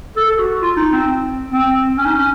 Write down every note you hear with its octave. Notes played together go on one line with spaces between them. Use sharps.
A4
A4
F#4
F4
D#4
C4
C4
C#4
D#4
C#4